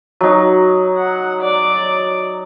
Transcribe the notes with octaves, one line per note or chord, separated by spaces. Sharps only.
F#3 D#4
F#5
D5